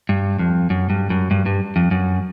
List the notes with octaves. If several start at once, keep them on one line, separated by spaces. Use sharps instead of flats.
G2
F2
F#2
G2
F#2
G2
G2
F2
F#2